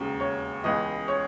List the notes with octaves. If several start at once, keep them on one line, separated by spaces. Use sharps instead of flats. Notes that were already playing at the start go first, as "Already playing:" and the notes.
Already playing: E1 D#2 C#3
C#5
C#2 C#3 E3 B3 D#5
C#5